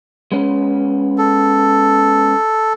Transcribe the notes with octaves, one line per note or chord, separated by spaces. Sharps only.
G#3 B3 C#4
A4